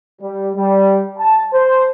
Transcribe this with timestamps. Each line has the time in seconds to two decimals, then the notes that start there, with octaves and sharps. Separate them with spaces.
0.22 G3
0.56 G3
1.18 A5
1.54 C5